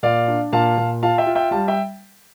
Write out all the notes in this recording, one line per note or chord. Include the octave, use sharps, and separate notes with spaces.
A#2 D5 F5
D4
A#2 F5 A5
A#2
F4 F5 A5
E5 G5
F4
E5 G5
G3 F5 A5
E5 G5